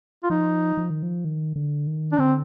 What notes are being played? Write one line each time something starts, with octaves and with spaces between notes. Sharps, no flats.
F4
F3 D#4
F3
D#3
F3
D#3
D3
D#3
D4
D3 C4